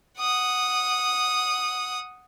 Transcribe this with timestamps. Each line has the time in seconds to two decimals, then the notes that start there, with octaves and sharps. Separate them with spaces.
0.19 F#5 D#6